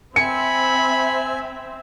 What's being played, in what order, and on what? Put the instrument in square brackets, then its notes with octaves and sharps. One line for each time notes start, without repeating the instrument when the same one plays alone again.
[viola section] C4 E5 [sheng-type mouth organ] G#5 [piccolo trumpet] B5 [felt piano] C#7